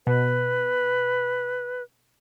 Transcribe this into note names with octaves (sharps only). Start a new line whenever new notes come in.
B2 B4